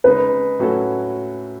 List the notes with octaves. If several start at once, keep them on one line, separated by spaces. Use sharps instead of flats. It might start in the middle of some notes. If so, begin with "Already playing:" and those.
C#3 G#3 D#4 B4
A2 F#3 C#4 F#4 A4